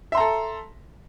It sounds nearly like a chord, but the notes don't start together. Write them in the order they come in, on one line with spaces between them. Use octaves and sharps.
E5 C6 A#5 A4